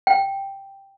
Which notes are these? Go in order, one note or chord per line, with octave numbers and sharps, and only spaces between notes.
G5